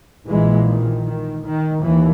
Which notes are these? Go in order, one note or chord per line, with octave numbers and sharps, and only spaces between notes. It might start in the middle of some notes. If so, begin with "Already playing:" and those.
A#1 A#2 E3 G#3
D#3
D#3
D#3
D#2 E3